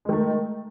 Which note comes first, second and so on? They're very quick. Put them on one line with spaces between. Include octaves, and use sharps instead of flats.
G#3 D#3 A3